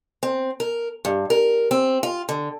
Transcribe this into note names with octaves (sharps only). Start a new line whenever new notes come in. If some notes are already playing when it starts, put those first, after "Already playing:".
C4
A#4
G2
A#4
C4
F4
D3